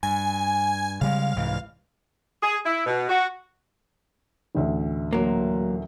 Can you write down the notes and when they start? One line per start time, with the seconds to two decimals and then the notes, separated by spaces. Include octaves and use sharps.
0.03 G2 G#5
1.01 C#3 G3 G#3 F5
1.36 C2 G#2 E3
2.43 G#4
2.65 E4
2.86 B2
3.09 F#4
4.55 A1 D2 E5
5.13 A#2 F#3 A#3